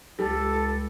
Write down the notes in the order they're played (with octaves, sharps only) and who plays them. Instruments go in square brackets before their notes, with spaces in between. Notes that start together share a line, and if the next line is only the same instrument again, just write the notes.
[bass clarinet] C#2 [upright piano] G3 [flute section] A4